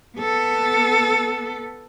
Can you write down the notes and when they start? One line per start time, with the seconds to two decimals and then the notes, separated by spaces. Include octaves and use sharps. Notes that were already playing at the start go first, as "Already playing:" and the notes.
0.18 B3 A4